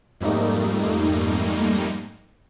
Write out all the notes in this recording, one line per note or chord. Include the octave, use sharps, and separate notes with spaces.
F2 G#2 G3 A3 A#3 D#4